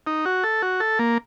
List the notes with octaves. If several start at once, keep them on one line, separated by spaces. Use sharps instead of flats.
D#4
F#4
A4
F#4
A4
A#3